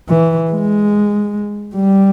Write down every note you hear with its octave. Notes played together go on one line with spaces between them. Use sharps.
E3
G#3
G3